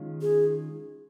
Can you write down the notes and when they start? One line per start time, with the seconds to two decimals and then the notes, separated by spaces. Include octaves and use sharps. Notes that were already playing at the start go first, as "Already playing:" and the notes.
Already playing: D#3 G#3 C#4 F4
0.22 G#4